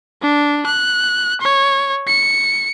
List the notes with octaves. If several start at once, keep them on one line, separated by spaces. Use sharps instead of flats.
D4
F#6
C#5
C#7